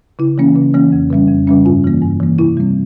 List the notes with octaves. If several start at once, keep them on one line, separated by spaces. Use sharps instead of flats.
C#3 E4
E3 A#3 C#4
C#3
E3 A#3 C#4
F2
C#3 G3 C#4
F2
C#3 G3 C#4
G2 F4
E3 A#3
G2
E3 A#3
C3 E4
G3 C4